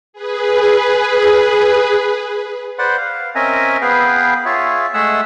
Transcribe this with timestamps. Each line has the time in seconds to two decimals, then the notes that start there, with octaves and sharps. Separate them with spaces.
0.13 G#4 B4
2.79 B4 C5 D5 F#5 C6
2.98 F5
3.35 C4 C#4 A#4 D#5 E5 G#5
3.82 B3 G#4 B4 F5 G5
4.45 F4 G#4 C#5 E5
4.94 G#3 A3 G#4 E5 F#5 E6